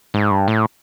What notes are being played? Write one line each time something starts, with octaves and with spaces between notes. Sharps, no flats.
G#2
G2
A2